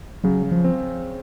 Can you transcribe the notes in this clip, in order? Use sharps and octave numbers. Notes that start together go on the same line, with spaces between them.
C#3 F#3
F3
C4